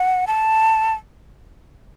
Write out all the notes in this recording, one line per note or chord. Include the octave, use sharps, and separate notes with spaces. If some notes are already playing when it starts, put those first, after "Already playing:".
Already playing: F#5
A5